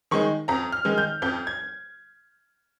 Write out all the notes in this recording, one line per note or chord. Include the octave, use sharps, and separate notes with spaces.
D#3 G#3 D#4 C#6
F2 A#5
F6
D#3 G#3 D#4
G6
F2 G6
G#6